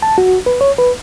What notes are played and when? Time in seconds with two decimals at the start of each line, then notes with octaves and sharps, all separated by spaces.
0.02 A5
0.18 F#4
0.46 B4
0.61 C#5
0.78 B4